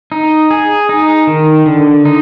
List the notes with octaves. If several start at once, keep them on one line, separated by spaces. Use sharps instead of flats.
D#4
G#4
D#4
D#3
D3
D#4